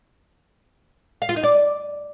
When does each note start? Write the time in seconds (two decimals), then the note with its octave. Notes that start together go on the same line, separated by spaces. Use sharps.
1.22 F5
1.29 F4
1.36 D#4
1.43 D5